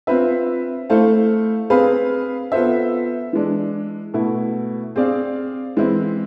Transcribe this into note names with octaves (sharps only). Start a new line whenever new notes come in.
C4 F4 B4 E5
A3 E4 A4 C5 F5
C4 G#4 B4 F5
B3 F4 A4 C5 E5
E3 G#3 D4
B2 A3 E4
C4 G#4 D5 F5
E3 G#3 C4 E4